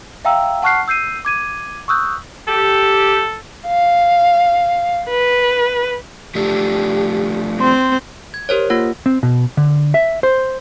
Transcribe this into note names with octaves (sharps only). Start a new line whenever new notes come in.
E5 F5 G5 A#5 E6
F#5 A5 C#6 F6 F#6 C7
E6 G6 C7 D#7
D6 G#6 D#7
C#6 D#6 E6 F#6 G6
G4 A4
F5
B4
F3 A3 D4 G4
C4 C6
G#6
G4 A#4 C5 C#5
A#3 F4 F#5
C4
B2
D3
E5
C5